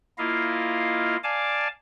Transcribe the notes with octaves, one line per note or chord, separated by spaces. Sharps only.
A#3 E4 F4 D#5 F5
D5 F5 G#5 A5 D6